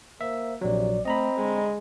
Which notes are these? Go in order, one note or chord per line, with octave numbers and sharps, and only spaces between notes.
A#3 C5 E5
A#1 C3 F#3 D5
A3 C4 D#5 A#5 B5
D3 G#3